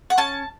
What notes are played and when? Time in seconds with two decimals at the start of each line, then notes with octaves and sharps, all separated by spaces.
0.10 F#5
0.18 C#4 A5